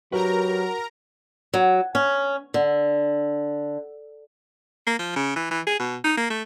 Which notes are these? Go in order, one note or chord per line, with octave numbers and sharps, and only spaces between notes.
F#3 F#4 G4 A#4 B4 A#5
F#3
C#4
D3
A#3
F3
C#3
E3
E3
G#4
B2
D#4
A#3
A3